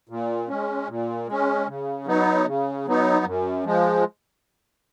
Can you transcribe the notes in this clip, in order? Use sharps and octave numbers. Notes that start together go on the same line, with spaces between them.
A#2
G#3 C#4
A#2
G#3 C#4
C#3
F#3 B3 D#4
C#3
F#3 B3 D#4
F#2
F3 G#3